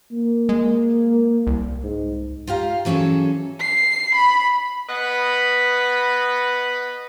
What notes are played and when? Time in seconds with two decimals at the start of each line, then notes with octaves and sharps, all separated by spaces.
0.12 A#3
0.49 G#3
1.47 C2
1.83 G#2
2.47 F4 G4 F5 A#5
2.85 E3 F#3 C#4 G#4 A4
3.60 C7
4.15 B5
4.88 B3 B4 D#5 B5